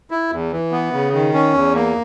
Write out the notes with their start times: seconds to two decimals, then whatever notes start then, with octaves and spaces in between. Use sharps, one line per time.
0.11 E4
0.31 E2
0.52 E3
0.72 B3
0.93 C#3
1.13 D#3
1.34 C#4
1.54 E2
1.75 A#3